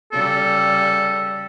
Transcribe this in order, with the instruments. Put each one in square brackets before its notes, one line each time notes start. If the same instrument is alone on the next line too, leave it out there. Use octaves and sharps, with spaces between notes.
[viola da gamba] C#3 G3 [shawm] A4